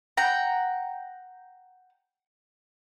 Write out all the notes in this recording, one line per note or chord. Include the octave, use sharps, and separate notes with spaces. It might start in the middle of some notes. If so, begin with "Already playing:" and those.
F#5 G5 A#5